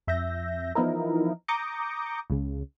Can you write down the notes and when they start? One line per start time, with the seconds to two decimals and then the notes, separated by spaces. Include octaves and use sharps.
0.07 F2 E5 G6 A#6
0.75 E3 F3 B3 D#4 E4 A#4
1.48 A#5 D6 D#6 G6 A#6 C#7
2.30 C#2 C#3